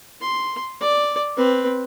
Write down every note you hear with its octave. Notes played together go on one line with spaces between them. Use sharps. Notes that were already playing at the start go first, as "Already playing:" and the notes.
C6
D5
C4 B4